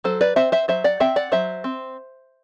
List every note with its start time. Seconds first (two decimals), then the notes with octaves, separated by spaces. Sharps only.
0.04 F#3 A4 C5
0.21 B4 D5
0.36 C4 C5 E5
0.52 C5 E5
0.68 F#3 C5 E5
0.84 D5 F#5
1.00 C4 E5 G5
1.16 D5 F#5
1.32 F#3 C5 E5
1.64 C4